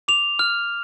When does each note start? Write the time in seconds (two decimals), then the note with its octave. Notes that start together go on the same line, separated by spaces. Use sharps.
0.08 D6 F7
0.39 F6